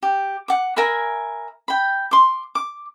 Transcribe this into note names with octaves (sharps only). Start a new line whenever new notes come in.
G4
F#5 D6
A#4 E5 G#5 B5
G5 B5
C6 D6
D6